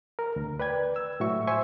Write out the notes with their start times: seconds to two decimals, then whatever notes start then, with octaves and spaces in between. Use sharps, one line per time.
0.19 A#4
0.36 D2
0.60 B4 D5 G5 G#6
0.96 E6
1.20 A2 F#3 F#4 E5 C#6
1.47 C5 E5 G#5 C6 C#6